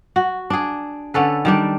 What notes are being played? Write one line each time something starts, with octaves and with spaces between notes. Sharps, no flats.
F#4
D4 G#4
D3 C#4 A4 B4
D#3 G3 D4